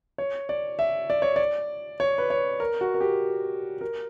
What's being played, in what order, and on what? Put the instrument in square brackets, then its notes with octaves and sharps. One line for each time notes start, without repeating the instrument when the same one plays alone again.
[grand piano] C#5
D5
E5
D5
C#5
D5
C#5
B4
C#5
A#4
F#4
A#4
G4
A#4